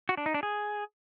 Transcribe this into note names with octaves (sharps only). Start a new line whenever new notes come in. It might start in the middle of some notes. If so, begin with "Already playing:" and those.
F#4
D4
D#4
D4
G#4